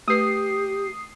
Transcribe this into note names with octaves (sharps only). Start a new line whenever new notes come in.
A3 G4 B4 D#6 C7